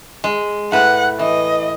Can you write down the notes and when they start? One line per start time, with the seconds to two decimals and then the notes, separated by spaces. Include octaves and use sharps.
0.24 G#3
0.72 A2 B4 F#5
1.19 E3 D#5